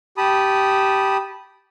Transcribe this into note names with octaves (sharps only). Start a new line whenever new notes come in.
G4 A5 B5 D#6